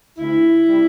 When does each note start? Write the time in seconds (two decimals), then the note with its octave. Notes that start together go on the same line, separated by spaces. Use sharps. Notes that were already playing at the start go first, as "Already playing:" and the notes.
0.18 D2 E4
0.65 C3 G3